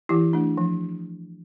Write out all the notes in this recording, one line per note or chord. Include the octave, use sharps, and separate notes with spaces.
E3 E4 G4
A3 D4
F3